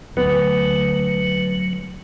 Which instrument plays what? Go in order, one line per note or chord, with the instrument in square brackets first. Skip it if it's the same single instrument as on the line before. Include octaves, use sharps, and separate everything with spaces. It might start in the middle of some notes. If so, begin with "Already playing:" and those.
[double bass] D2 [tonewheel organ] F#3 [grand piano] B3